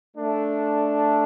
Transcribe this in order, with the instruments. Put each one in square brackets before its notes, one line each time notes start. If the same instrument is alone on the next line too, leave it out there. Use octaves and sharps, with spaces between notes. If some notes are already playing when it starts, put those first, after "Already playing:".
[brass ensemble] A3 D4 A4